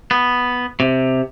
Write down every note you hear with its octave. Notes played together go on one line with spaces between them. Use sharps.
B3
C3